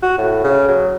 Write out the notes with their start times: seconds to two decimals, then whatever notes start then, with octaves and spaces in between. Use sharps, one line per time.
0.03 F#4
0.18 A2
0.44 C#3
0.68 F#3